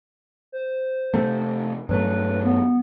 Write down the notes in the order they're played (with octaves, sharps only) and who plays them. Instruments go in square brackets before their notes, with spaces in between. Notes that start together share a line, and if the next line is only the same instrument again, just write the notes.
[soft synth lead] C5
[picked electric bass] C3 A3
[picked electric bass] G2 F#3 A3 [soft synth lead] B4
[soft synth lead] B3